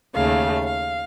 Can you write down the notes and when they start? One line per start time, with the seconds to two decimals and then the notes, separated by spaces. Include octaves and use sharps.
0.15 D#2 C#3 A3 F5
0.66 F5